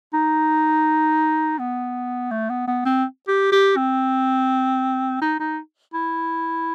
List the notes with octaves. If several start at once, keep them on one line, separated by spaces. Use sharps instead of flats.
D#4
B3
A3
B3
B3
C4
G4
G4
C4
D#4
D#4
E4